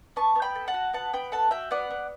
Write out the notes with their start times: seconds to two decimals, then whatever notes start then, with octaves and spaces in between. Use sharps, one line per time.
0.16 B3 A5 C#6
0.35 B3
0.42 G5 B5
0.55 A4
0.68 F#5 A5
0.74 F#4
0.93 B3 F#5 A5
1.13 B3 G5 B5
1.32 A4 F#5 A5
1.51 F#4 E5 G5
1.71 B3 D5 F#5
1.91 B3